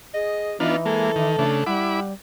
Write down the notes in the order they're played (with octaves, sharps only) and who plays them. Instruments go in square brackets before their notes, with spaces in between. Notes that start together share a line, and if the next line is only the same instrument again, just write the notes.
[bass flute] G#4 [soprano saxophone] D#5
[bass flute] E3 [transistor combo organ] B3 D4 F4 [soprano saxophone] D#4
[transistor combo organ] G#3 A#3 [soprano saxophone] A4
[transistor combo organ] D#3
C#3 A3 D4
[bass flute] G3 [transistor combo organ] E4 B5 D6 [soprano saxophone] F#5